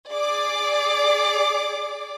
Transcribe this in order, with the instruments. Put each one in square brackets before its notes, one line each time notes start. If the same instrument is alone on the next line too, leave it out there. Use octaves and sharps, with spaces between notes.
[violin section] G#4 D5 D6